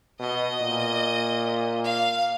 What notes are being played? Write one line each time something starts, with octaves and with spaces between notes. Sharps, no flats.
B2 D#5
A#2
F5